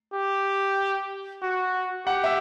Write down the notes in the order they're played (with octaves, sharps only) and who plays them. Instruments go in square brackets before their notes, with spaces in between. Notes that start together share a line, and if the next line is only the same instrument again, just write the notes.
[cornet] G4
F#4
[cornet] G4 [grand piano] F#5
[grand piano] E5